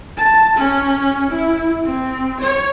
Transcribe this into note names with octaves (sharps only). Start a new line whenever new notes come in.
A5
C#4
E4
C4
C#5